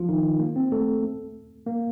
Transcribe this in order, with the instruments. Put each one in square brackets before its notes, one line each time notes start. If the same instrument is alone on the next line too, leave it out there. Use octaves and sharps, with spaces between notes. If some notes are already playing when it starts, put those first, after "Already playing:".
Already playing: [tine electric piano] F3 F4
D#3 D#4
A#3
C4
A3 A4
A#3